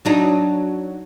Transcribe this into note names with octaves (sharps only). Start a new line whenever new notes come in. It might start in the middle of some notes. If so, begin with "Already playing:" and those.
F#3 D4 D#4